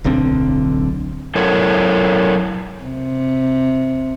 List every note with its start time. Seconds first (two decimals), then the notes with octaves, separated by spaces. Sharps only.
0.04 D1 B1 D3 C4
1.35 F#3 E4 A4 A#4 C#5
2.84 C3